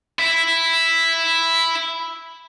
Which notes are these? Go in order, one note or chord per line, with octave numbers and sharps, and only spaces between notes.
E4 E5